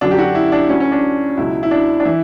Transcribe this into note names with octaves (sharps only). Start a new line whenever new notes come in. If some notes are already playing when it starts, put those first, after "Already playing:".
F#2 D3 F#3 D4
G4
F#4
E4
D4
D2 D3 F#3 C#4
C#4
D4
C#2 B2 F#3 E4
E4
D4
D4
E3 E4